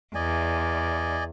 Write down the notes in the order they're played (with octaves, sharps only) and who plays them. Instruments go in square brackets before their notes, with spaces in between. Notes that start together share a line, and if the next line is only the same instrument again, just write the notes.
[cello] E2 [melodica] D5 D#5 G#5